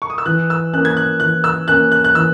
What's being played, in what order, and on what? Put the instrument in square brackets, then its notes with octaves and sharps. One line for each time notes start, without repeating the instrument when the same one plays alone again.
[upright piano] C#6
D#6
E6
[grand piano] E3 [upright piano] F#6
[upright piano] E6
[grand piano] A#3 C#4 [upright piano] F#6
[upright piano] G#6
F#6
[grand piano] E3 [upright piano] F#6
[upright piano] E6
[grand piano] A#3 C#4 [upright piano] F#6
[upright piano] F#6
F#6
[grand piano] E3 [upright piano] E6